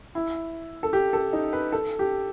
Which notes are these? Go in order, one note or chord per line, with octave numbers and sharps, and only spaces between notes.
E4
A4
G4
A4
D#4
B4
A4
G4